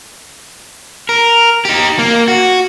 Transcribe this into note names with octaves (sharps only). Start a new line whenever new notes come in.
A#4
D#4 G4
A#3
F#4